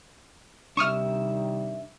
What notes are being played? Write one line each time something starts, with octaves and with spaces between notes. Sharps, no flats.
C3 D#3 G3 D4 E5 C#6 D#6 F6